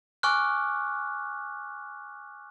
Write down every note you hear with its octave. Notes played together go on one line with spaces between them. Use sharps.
G#5 C#6 D6 F6 F#6